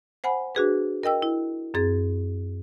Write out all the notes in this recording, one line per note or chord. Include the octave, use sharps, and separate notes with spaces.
C5 F#5 G#5 B5
D4 F#4 G#4 B4
A#4 D#5 G5 E6
E4
F#2 C4 G#4 A6